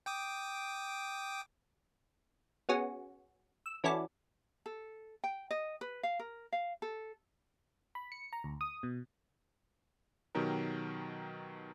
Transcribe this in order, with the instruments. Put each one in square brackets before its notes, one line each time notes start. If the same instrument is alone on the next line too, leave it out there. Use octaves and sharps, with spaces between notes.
[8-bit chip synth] G5 D6 D#6
[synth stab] B3 C#4 F#4 G#4
E6
E3 C#4 E4 F#4 A4 D5
[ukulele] A4
G5
D#5
B4
F5
A#4
F5
A4
[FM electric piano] B5
C#7
A#5
D2
D#6
B2
[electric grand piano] B2 D#3 F#3 G4 A#4